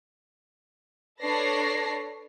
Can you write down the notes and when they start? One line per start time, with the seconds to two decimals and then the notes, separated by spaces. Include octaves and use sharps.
1.21 D4 A4 B4 C#5 A#6 C7